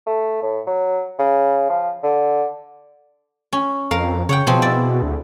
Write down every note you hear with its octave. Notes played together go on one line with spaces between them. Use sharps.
A3
A2
F#3
C#3
F3
D3
C#4
F2 A#4 F5
C#3 C#5 F#5 G5
B2 F3 C4 G#4
E4 D5
D2